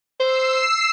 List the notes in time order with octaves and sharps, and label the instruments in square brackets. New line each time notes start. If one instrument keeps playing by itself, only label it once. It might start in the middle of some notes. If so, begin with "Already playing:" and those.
[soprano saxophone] C5 [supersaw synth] E6 C7